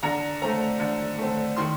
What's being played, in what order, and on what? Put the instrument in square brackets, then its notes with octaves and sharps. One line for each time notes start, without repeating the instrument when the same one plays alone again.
[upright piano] D3 A#5
A3 C4 A#5
D3
A3 C4
D#3 C6